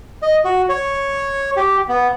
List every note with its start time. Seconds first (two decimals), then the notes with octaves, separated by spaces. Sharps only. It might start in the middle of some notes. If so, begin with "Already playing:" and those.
0.22 D#5
0.44 F#4
0.69 C#5
1.57 G4
1.89 B3